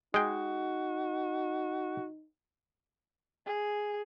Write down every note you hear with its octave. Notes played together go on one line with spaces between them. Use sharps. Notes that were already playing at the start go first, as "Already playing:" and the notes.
G#3 D#4 F#4 G5
G#4